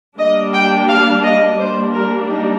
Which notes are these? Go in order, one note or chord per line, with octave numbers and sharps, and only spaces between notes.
G3 A#3 D4 D#5
G5
F5
D#5
G3 A#3 D4 C5
A#4
D#4